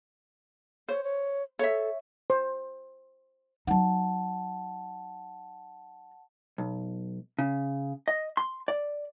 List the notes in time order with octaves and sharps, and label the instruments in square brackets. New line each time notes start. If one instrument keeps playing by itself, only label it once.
[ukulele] C5 [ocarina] C#5
[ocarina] C#5
[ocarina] A4 [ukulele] C#5 E5
[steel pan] C5
[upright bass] F#3 D#4 [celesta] F#5 A5
[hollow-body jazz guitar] B1
C#3
D#5
C6
D5